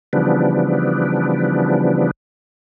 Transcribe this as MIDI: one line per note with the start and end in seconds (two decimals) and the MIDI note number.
0.13 2.11 49
0.13 2.11 52
0.13 2.11 53
0.13 2.11 55
0.13 2.11 59
0.13 2.11 62